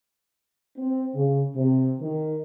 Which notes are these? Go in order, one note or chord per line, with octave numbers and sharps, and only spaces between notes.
C4
C#3
C3
D#3